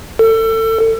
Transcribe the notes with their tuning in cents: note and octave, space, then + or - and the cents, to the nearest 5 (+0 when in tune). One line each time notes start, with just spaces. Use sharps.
A4 +30